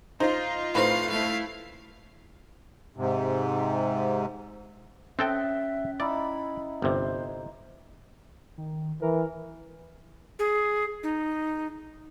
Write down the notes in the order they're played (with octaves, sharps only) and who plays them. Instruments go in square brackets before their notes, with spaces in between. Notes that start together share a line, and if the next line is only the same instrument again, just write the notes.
[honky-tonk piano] D#4 [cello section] F4 [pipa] C5
[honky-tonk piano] A2 [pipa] C4 D#4 B4 [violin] F5
[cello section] A3 E4 [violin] F5
[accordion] G#2 C3
[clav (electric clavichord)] C4 A4 G5 [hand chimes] C#4 [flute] E5
[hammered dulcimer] D#4 E4 [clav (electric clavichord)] D5 [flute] B5
[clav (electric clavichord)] G1 C3 [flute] C5
[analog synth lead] D#3
[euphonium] E3 [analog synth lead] A#4
[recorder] G#4
D#4